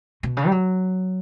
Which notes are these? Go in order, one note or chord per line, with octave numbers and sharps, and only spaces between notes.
B2
C#3
G3
F#3